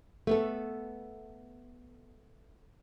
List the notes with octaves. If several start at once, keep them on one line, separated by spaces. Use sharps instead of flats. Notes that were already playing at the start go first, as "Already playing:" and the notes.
A3 B3 A4